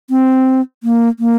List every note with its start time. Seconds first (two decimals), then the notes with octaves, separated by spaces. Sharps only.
0.10 C4
0.83 A#3
1.19 A#3